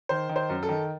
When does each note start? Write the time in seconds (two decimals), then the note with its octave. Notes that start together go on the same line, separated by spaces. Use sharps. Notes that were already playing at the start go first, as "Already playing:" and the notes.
0.09 D#3 C5
0.29 D#3
0.36 C5
0.49 F#2
0.63 A4
0.69 D#3